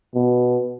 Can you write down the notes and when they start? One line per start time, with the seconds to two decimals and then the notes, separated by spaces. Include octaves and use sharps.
0.15 B2